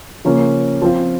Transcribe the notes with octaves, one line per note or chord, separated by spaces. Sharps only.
C#3 F3 A#3 C#4
F3 C4 F4